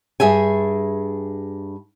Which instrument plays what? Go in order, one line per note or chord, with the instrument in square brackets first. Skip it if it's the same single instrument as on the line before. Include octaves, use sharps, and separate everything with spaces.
[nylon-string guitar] G2 G#4 E5 G#5